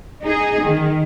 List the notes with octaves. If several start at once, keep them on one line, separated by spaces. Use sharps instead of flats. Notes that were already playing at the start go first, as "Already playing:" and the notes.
D#4 G#4
D#3